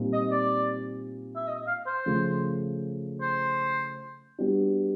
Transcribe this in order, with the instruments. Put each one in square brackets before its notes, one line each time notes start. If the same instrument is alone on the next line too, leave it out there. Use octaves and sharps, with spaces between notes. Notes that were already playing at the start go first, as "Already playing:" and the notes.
Already playing: [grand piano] A#2 G3 C4 D#4
[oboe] D#5
D5
E5
D#5
F5
C5
[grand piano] C#3 F3 A3
[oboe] C5
[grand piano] G3 B3 D4 F#4